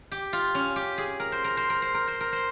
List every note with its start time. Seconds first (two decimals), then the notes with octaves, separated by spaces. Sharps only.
0.12 G4
0.33 F4
0.55 C#4
0.76 G4
0.98 G#4
1.20 A#4
1.32 C5
1.44 A#4
1.57 C5
1.70 A#4
1.82 C5
1.94 A#4
2.08 C5
2.20 A#4
2.32 C5